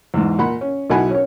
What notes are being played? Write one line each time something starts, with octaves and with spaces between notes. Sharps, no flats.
E2 G#2
A#2 F#5 B5
C#4
B1 B2 E4 F#5 G#5 B5
C#4 C#5